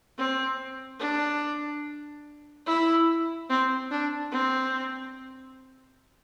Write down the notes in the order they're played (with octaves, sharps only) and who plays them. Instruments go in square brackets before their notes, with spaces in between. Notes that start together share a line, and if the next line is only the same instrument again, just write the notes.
[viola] C4
D4
E4
C4
D4
C4